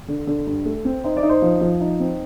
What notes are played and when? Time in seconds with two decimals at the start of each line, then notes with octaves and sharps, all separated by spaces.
0.08 D3
0.27 D3
0.47 G2
0.65 A3
0.85 C4
1.04 D#4 C5
1.17 D5
1.23 D#4
1.29 C5
1.42 F3
1.61 F3
1.80 D#4
2.00 C4